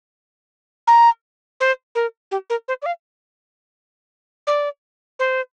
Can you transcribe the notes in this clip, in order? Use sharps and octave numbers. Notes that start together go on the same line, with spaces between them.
A#5
C5
A#4
G4
A#4
C5
D5
F5
D5
C5